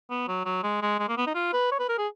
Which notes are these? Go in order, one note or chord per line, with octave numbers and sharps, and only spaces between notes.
B3
F#3
F#3
G#3
G#3
G#3
A#3
B3
D#4
F4
B4
C#5
B4
A#4
G#4